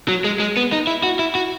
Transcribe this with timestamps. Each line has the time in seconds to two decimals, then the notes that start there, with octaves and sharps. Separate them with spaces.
0.08 F#3
0.24 G#3
0.40 G#3
0.57 B3
0.73 D#4
0.87 E4
1.03 F#4
1.19 E4
1.35 F#4